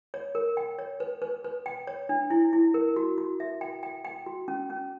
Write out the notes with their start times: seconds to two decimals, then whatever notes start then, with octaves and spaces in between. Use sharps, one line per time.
0.14 C#5
0.35 A#4
0.57 G5
0.79 C#5
1.00 B4
1.22 B4
1.44 B4
1.66 G5
1.87 C#5
2.09 D4
2.30 E4
2.53 E4
2.74 A#4
2.96 F#4
3.18 F#4
3.40 E5
3.61 G5
3.83 G5
4.05 G5
4.26 F#4
4.48 C#4
4.70 C#4